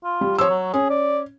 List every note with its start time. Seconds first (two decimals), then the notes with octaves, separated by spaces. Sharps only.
0.04 F4
0.21 G3
0.38 F3 C#5 E6
0.50 F#3
0.74 C#4 G#4
0.90 D5